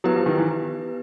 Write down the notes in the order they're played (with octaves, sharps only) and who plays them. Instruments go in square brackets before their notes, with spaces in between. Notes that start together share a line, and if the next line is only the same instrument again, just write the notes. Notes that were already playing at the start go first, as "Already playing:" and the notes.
[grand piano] F#3 [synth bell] B3 E4 G4 B4
[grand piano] F3
D#3
E3